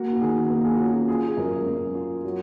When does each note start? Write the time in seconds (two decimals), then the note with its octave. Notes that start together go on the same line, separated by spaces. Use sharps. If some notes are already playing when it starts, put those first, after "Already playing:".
Already playing: A#3 F#4
0.13 F#4
0.21 D#3 G#4
0.50 A#3
0.64 G#4
0.75 F#4
0.79 C#4 F4
0.93 F#4
1.08 F4 G#4
1.28 G#4
1.37 F#2 A#4
1.66 F#2
1.95 F4
2.24 F#3